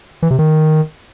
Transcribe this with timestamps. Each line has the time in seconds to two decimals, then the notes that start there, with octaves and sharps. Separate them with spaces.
0.22 E3
0.31 C3
0.39 D#3